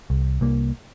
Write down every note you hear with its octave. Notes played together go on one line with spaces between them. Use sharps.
C2
C2 A#3